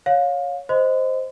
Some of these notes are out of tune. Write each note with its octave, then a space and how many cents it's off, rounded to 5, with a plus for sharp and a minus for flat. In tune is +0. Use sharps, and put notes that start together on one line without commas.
C#5 +0 F5 +25
C5 +0 D#5 +0 C6 -40